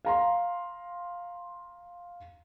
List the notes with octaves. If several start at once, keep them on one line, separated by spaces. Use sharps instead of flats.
F5 A#5 C6